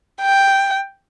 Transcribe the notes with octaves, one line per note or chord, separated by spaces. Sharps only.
G5